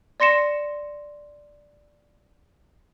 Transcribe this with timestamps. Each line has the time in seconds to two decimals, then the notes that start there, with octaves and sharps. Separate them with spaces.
0.20 D5 C6 A#6 C#7 E7